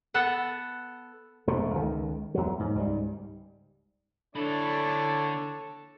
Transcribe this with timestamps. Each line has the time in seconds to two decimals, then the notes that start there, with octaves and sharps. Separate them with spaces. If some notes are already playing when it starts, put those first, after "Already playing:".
0.14 B3 A4 F#5
1.47 E1 F2 C3 A3
1.74 C#2 D#3
2.34 E2 F#3
2.59 G#2
2.75 C#2 G#2 F#3 G3
4.35 D3 D4 E4 A4 C#5 D5 B5